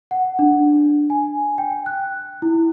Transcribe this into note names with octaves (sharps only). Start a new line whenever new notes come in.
F#5
D4
G#5
G5
F#6
E4